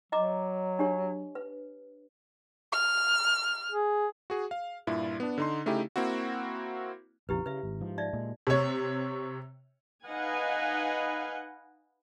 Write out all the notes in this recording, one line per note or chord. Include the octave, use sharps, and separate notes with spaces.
F#3 D#5 A#5 D6
D4 G4 C#5
B4
F6
G#4
F#4 G#4
F5
G2 A#2 E4 F4
B3 D4
D3 D#4 C6
C#3 A3 D#4 E4 G4
A#3 C4 E4 F#4
A#1 F2 C#3 E4 G4 B4
C#3 B4 E5
G#1
G#2 F3
D#4 D5 E5
A#2 G#3
C3 C#5
D#4 B4 D#5 F5 F#5 G#5